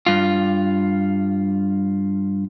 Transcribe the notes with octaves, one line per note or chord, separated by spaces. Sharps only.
G2 F4